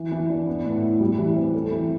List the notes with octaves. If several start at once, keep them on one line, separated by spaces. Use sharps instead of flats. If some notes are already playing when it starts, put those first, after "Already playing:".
Already playing: E3
E3
D4
B3
A2
E4
G3
E3
C4
A4
E3